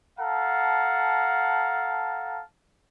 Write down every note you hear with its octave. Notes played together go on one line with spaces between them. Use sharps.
A4 F5 F#5 A5 A#5